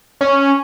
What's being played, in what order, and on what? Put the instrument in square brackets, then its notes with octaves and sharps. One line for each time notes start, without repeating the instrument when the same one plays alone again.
[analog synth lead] C#4